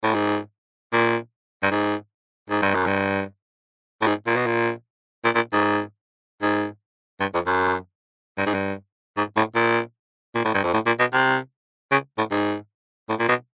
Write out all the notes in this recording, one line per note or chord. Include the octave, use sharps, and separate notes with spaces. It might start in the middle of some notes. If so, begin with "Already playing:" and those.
A2
G#2
A#2
G2
G#2
G#2
G2
F#2
G2
A2
G#2
A#2
B2
A#2
A#2
A#2
G#2
G#2
G2
F2
F#2
G2
G#2
G2
G#2
A2
A#2
A#2
A2
G2
F2
A2
A#2
B2
C3
C#3
A2
G#2
A2
A#2
B2